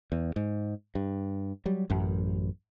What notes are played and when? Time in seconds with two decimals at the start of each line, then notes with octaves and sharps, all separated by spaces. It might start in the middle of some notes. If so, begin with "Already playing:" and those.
0.12 E2
0.36 G#2
0.95 G2
1.65 F#3 G3
1.90 A1 F#2